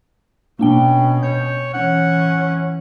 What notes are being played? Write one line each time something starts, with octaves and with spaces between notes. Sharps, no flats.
B2 A#3 C#4 D4 G5
C#5 G6
E3 C#4 F#5